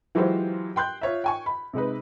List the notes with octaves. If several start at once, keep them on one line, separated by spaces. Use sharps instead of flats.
E3 F#3 G#3 F4 G4 C5
G5 C6 F#6 G6
F4 C#5 E5
G5 G#5 C#6
B5
C3 G#3 D#4 B4